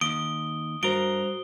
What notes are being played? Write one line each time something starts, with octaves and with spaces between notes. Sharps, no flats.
D#2 D#6 D7 G7
G2 F#4 A#4 C5 D7 G7